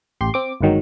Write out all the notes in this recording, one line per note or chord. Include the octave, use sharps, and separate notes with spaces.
A1 G4 C6
C4 D6
G1 D2 G#2 D#3 F#3